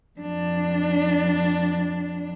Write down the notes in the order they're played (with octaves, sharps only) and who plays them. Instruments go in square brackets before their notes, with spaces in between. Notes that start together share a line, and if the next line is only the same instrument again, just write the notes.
[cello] F2 D4